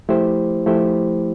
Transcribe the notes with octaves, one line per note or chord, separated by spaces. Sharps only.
F3 A3 E4 G4 C5
F3 A3 E4 G4 C5